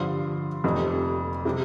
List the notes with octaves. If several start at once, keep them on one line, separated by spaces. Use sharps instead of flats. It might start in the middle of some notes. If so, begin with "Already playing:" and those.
Already playing: G2 D3 F3 C6
F1 F2 C3
C3 G3